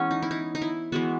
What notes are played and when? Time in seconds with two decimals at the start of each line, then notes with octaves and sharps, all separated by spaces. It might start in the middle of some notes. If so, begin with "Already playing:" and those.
Already playing: E3 G#3 B3 C#4
0.11 D#4
0.22 E4
0.31 D#4
0.55 D#4
0.62 E4
0.92 E3 G#3 B3 F#4